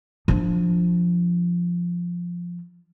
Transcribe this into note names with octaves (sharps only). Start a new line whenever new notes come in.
F3 D4